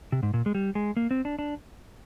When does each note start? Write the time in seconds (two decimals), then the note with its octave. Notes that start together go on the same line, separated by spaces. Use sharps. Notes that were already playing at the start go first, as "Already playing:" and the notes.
0.12 C3
0.23 G#2
0.34 A#2
0.46 G#3
0.55 G3
0.75 G#3
0.97 A#3
1.11 C4
1.25 D4
1.39 D4